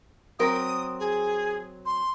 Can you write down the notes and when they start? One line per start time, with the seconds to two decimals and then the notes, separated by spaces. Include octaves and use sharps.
0.39 F#3 C4 A#4 D#6
0.99 G#4
1.86 C6